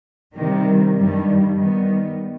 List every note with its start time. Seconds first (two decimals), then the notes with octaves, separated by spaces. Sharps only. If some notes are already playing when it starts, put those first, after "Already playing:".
0.34 C3 D#3 G3
0.95 G2 D#3 G3
1.55 D#3 G3 B3